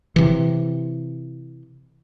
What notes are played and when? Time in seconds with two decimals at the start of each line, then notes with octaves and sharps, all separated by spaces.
0.16 C3 E3